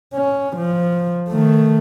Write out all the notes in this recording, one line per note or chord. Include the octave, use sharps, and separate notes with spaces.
C#4
F3
D#3 A3